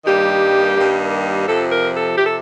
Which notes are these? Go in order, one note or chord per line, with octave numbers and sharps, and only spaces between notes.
G2 D#3 G3 A#3 G4
G2 D#3 G3 A#3
F2 C3 F3 A4
A#4
A4
C3 F3 G4
A4